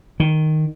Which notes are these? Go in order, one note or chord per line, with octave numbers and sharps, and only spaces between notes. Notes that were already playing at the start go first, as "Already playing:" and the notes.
D#3